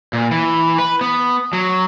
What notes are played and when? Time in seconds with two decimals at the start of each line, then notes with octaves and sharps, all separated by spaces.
0.13 A#2
0.31 E3
0.78 B4
1.01 B3
1.53 F#3